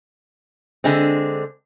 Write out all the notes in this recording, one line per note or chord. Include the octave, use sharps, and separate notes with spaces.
D3 G#3 C4